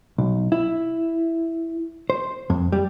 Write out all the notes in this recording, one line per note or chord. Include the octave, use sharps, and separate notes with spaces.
B1
E4
C5
F2
G3